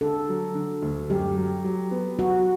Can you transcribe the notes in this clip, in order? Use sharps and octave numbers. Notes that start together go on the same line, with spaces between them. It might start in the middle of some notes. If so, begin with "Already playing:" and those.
D3 A4
F#3
D3
D2
F#2 G4
F#3
F#3
B3
F#3 F#4